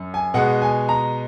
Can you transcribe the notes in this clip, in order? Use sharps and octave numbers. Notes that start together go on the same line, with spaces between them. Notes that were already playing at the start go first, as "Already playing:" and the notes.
Already playing: F#2
G#5
B2 G#3 F#5
G#5
A#5